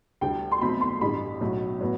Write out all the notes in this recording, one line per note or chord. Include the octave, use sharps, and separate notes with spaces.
D2 D3 G3 G5
C6
B1 B2 A3 C4 B5
C6
A1 G2 D3 G3 B5
B1 A2 F#3
A2 F#3 B3